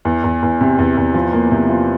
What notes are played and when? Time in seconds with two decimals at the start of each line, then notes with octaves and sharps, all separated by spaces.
0.05 E2
0.24 E2
0.42 E2
0.61 C3
0.79 E2
0.97 E2
1.14 F3
1.33 A#3
1.51 C3
1.69 F3